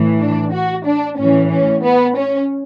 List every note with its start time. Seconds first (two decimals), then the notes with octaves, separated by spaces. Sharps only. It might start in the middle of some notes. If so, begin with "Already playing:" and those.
Already playing: A2 E3
0.20 D4
0.53 F#4
0.86 D4
1.18 A2 E3 C#4
1.51 C#4
1.83 B3
2.16 C#4